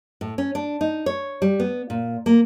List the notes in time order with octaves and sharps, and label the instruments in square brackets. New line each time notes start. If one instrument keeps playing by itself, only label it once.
[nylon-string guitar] A2
C#4
D4
D#4
C#5
G3
B3
A#2
A#3